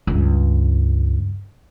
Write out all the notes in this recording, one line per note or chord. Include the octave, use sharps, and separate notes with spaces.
C#2 G2